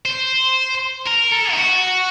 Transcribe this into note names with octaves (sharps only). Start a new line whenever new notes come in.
C5
A#4
A4
D#4
F#4